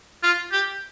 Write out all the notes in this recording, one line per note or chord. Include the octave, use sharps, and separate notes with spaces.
F4
G4